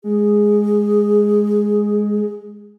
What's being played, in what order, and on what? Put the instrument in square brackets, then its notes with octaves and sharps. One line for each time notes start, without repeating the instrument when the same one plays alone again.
[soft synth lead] G#3 [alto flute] G#4